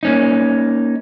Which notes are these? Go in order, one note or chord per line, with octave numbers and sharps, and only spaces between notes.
A#3 C#4 D#4